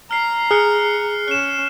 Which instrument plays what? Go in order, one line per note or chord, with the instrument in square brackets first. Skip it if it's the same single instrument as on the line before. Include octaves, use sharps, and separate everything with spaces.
[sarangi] A#5 [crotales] F6 C7
[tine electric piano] G#4 [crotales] F6 F#6 C#7
[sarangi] C#4 [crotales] F#6 E7